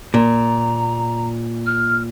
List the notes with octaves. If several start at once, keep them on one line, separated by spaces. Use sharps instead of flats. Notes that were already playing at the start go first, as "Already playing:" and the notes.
A#2 A#5
F6